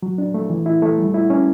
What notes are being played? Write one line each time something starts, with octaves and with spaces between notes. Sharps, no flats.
F#3
D4
A3
E3
E4
A3
G3
E4
C#4